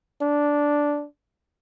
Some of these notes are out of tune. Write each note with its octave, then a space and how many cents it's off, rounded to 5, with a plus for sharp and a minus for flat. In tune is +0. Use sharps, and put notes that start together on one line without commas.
D4 -5